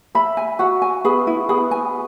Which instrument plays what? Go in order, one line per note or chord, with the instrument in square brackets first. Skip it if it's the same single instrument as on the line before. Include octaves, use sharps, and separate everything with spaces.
[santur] E5 [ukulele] B5
[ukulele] G#5
[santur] F#4 [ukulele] F#5
[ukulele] G#5
[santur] B3 [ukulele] G#4
[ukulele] E4
[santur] B3 [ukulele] G#4
[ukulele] G#5